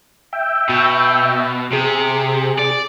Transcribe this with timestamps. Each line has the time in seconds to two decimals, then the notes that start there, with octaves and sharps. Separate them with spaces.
0.33 E5 G5
0.69 B2
1.73 C3 G#4
2.59 D5